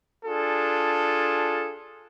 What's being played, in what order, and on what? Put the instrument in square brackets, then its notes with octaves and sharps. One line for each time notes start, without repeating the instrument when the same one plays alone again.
[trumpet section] D4 F4 G#4 A4